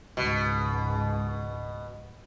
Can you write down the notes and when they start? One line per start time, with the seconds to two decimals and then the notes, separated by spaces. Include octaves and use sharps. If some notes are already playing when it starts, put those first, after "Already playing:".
0.17 C#2 G#2 B2